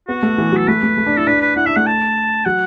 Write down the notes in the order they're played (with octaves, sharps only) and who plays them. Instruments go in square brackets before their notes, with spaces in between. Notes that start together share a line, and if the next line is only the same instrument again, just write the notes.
[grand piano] B3 [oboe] F#4
[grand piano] A3
E3
[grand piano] F#3 [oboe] A4
[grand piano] A3 [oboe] B4
[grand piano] A3
A3
D4
[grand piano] E4 [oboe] A4
[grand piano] D4 [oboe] B4
[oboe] B4
[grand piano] E4 [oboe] F#5
[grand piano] D4 [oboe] E5
[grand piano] A3 [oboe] F#5
[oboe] A5
[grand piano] F#3 [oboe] F#5